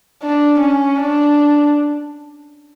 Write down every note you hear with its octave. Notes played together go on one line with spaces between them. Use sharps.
D4
C#4
D4